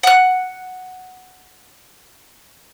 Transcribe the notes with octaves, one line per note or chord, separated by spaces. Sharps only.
F#5 F#6